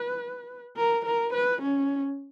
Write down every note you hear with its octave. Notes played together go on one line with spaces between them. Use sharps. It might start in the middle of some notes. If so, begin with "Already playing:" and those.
Already playing: B4
A#4
A#4
B4
C#4